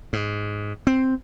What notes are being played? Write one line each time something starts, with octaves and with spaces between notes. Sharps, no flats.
G#2
C4